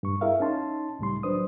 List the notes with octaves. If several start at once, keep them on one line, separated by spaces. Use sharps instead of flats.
G2 C#6
E4 G#4 A#4 E5 F5
C#4 D#4 A5 C6
C#2 A2 G3 C6
F#3 D4 B4 C5 D#6